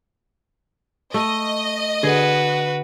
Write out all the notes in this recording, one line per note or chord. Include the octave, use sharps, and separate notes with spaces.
A3 D#5
D3 F#4 G#4 B4